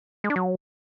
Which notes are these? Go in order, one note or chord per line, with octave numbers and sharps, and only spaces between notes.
G#3
D4
F#3